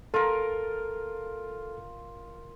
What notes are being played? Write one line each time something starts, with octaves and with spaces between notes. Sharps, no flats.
F4 A4 A#4